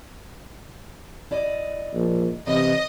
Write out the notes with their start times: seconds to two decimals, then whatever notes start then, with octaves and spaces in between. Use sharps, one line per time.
1.31 E4 D5 D#5
1.94 A#1
2.47 C3 E3 D#5